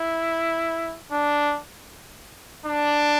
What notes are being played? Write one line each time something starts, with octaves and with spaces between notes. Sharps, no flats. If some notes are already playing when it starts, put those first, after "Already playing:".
Already playing: E4
D4
D4